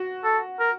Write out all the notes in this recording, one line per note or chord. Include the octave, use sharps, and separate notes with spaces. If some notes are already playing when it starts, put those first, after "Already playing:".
Already playing: F#4
A4
A#4